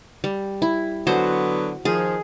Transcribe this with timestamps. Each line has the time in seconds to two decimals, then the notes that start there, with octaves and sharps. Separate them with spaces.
0.24 G3
0.62 E4
1.07 D3 F#3 B3 F#4 C5
1.85 D#3 F3 G#4